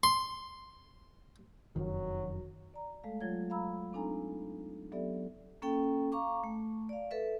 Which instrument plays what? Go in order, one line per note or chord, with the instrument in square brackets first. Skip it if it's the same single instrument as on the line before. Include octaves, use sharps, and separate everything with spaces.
[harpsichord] C6
[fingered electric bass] F1 F#2 D#3 [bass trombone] F#3
[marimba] D5 A#5
G#3 A3 A4 F5
F#3 F4 C#5 G#6
F5 A#5 B5 E6
C4 D4 D#4 A4 G#5 A#5
F#3 B3 G4 A4 D5 E5
[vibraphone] A#3 C#4 A4 G5
F5 A#5 C#6 D6
A3
D5 F5
A4 B4 E5